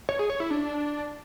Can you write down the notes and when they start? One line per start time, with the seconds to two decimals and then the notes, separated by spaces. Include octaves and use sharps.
0.09 C#5
0.19 G#4
0.30 C#5
0.40 E4
0.51 D4